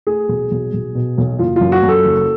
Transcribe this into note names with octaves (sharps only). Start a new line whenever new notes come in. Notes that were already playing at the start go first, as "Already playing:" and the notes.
A3 G#4
B1
B1
B1
B2
B1
F#1 F4
F#2 F4
F#4
F#2
A4
F#1